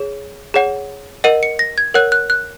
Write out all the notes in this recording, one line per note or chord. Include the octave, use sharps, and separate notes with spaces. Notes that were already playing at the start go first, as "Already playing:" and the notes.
Already playing: G#4 C#5
G#4 C#5 F#5
A#4 D#5 F#5 D#7
C#7
A#6
G#6
A#4 C#5 F#5 F#6
F#6
F#6